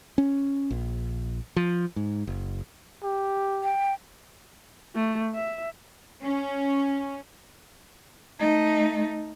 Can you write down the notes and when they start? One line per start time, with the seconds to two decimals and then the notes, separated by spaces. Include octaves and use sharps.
0.18 C#4
0.70 A#1
1.56 F3
1.96 G#2
2.27 F#1
3.03 G4
3.63 G5
4.95 A3
5.34 E5
6.23 C#4
8.39 A3 D#4